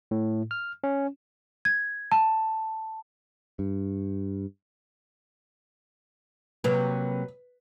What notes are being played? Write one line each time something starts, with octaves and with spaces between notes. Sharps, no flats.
A2
F6
C#4
G#6
A5
G2
C3 F#3 A#3 B4